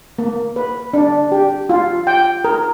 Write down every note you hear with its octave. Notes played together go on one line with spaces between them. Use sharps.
A#3
B4
D4
G4
F4
G5
A#4